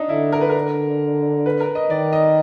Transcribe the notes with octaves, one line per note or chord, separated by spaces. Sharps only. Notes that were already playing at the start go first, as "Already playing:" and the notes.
Already playing: D4 D#4
D3 E4
A#4
B4
A#4
B4
A#4
D#5
D#3 D5
D#5